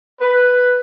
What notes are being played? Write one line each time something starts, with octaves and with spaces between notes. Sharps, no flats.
B4